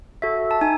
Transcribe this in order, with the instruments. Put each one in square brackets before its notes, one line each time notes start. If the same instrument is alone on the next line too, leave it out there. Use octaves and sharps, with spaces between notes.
[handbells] F#4 A4 E5
A5
D#4 G#5